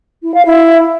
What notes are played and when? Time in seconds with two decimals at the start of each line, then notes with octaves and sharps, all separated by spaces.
0.22 E4
0.34 F5
0.45 E4